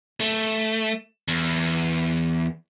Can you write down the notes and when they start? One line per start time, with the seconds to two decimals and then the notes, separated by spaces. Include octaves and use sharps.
0.20 A3
1.28 E2